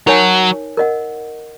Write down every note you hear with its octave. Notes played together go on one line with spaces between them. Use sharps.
F#3 D#4 A#4 C#5 G#5
A#4 D#5 F#5